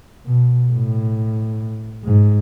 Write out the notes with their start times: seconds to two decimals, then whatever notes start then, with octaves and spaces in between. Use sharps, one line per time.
0.26 B2
0.71 A2
2.05 G#2